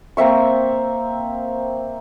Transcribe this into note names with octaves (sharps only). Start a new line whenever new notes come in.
A#3 C4 E5 C#6